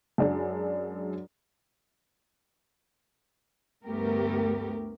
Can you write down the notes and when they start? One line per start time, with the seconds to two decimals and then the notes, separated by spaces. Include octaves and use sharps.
0.18 F#2 F#3 G#3 D4
3.85 D2 G2 A3 B3 G4 A#4